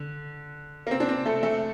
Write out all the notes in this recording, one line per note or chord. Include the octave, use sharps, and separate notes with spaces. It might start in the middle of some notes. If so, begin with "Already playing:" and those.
Already playing: D3
A#3
C4
D4
C4
A3 A4
A3 A4